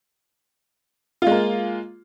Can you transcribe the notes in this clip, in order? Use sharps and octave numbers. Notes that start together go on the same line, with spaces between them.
G#3 A#3 F4